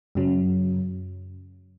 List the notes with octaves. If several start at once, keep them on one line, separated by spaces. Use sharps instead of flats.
F#2 C#3 F#3